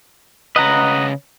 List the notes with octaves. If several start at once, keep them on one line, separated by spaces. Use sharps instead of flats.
C#3 B4 D#5 F#5 A#5